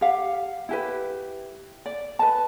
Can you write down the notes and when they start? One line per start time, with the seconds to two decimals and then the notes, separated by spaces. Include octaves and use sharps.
0.01 G4 F5 F#5
0.69 E4 G4 B4
1.86 D5
2.19 B4 D#5 A5